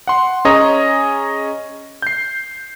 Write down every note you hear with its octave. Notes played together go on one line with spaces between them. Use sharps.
F#5 C6
C#4 G#4 C#5 D#5 A#5
G6 C7